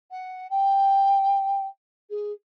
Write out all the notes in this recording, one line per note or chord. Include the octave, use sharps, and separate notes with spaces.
F#5
G5
G#4